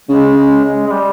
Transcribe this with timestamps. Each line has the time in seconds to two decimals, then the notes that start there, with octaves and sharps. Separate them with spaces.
0.09 C#3 G#3
0.37 G#3
0.64 G#3
0.86 G#3
0.92 G3